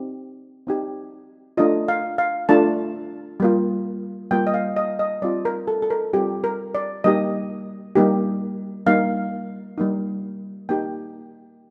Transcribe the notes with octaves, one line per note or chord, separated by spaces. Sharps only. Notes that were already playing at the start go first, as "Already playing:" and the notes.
Already playing: C4 D#4 G4
C4 D#4 G4
A3 D4 F4 D#5
F5
F5
A3 D4 F4 A5
G3 A#3 F4
G3 A#3 F4 G5
D#5
F5
D#5
D#5
G3 C4 F4 D5
A#4
A4
A4
A#4
G3 C4 F4 G4
A#4
D5
G3 A#3 D#4 G4 D#5
G3 A#3 D#4 G4
G3 A#3 D#4 F5
G3 A#3 D#4
A#3 D#4 G4 G5